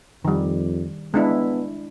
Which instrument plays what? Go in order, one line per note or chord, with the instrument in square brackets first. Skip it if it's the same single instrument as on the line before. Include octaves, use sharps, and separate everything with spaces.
[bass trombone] F2 [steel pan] D#3 G3
[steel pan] G#3 D4 E4 [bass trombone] B3